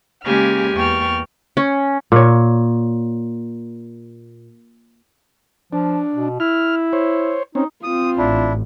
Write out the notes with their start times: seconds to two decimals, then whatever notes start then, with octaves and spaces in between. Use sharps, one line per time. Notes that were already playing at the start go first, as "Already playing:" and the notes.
0.24 C#3 G#3 A#3 G4 G#5 F6
0.75 E2 A#3 G5 C#6 F6 A6
1.57 C#4
2.12 A#2 C#5
5.73 F3 D4
6.15 B2
6.40 E4 F6
6.93 C5 C#5
7.55 C4 C#4 D#4
7.84 C4 F4 D#6
8.18 A1 D4 E4